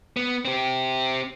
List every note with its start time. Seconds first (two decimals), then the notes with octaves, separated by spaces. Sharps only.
0.17 B3
0.45 C4 G4